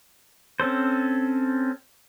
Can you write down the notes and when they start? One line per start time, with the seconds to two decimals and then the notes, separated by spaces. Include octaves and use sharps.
0.60 C4 C#4 A4 C5